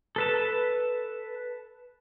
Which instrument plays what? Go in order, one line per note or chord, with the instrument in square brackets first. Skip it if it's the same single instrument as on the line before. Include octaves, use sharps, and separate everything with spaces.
[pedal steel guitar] A4 B4 A5